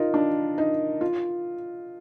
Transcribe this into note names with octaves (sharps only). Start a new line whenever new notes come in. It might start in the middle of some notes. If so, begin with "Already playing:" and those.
Already playing: D#4 F4 A#4
D4
D#4
F4